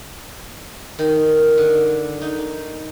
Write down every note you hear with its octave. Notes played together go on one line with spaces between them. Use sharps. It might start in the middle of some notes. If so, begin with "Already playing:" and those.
D#3
D3
D#4